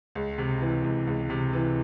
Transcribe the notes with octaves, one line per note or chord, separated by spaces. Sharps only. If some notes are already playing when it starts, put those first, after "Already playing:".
C#2
C3
E3
C#2
C#2
C3
E3